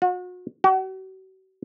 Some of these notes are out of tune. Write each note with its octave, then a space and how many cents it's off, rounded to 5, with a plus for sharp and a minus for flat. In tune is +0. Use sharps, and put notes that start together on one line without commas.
F#4 -40
F#4 +40